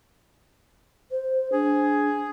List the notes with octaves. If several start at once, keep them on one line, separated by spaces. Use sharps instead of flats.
C5
D4 G#4